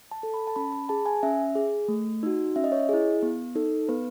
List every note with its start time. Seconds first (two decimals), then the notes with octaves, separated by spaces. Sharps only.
0.11 A5
0.23 A4
0.34 B5
0.47 A5
0.56 C#4 B5
0.73 B5
0.89 G#4 A5
1.06 G#5
1.23 C#4 E5
1.55 G#4
1.88 A3
2.23 D#4 F#4
2.56 C#4 E5
2.64 D#5
2.72 C#5
2.80 D#5
2.89 E4 G#4
3.22 B3
3.55 D#4 A4
3.89 B3 B4